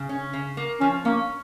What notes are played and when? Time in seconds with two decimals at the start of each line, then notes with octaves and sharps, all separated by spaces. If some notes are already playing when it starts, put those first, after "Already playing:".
Already playing: C#3
0.09 C#4
0.33 C#3
0.57 A#3
0.81 F3 C#4
1.05 A#3 C#4